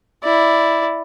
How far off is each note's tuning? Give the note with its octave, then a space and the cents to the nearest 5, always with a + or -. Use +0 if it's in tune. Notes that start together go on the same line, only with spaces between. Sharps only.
E4 +0 D5 +0